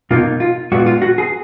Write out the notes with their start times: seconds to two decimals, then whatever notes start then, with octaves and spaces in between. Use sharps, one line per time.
0.11 B2 A#3 D#4 F4
0.40 F4
0.72 A#2 G#3 B3 F4 F#4
0.86 F4
1.02 F#4
1.18 G#4